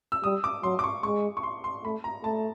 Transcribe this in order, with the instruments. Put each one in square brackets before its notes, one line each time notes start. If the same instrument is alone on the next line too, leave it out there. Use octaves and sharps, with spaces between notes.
[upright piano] E6
[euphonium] G3 [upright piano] D#6
[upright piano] D6
[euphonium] F#3 [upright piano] C6
[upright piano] D6
C#6
[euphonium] G#3 [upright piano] C#6
[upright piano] C#6
C6
C6
[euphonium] A3 [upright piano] B5
[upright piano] A#5
[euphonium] A3 [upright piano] A5